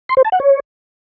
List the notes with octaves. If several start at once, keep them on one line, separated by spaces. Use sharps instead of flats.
C6
C5
A5
F#5
C#5